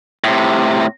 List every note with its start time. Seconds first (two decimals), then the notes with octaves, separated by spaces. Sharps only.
0.24 A2 C3